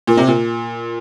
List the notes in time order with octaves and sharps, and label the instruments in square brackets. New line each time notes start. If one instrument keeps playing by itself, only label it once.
[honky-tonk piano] A#2
C3
A#2